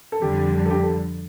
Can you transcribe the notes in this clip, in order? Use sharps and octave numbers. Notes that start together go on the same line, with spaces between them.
A4
F2 D3 G3 G4
A4
G4
A4